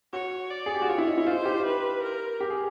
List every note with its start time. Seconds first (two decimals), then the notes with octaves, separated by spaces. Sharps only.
0.13 F#4 C#5
0.51 D5
0.66 G#4
0.74 G4
0.82 F#4
0.88 F4 C#5
0.98 E4
1.07 D#4
1.18 E4
1.26 F4 C5
1.45 G4
1.65 B4
2.03 A#4
2.40 G4
2.50 G#4